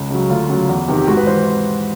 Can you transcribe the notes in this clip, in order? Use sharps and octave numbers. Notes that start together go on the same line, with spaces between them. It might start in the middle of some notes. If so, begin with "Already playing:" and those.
Already playing: C#2
C#3 F#3
D2 F4
C#3 F#3
E2
C3 D#3
G4
G#2 F#4
B4
E3 C5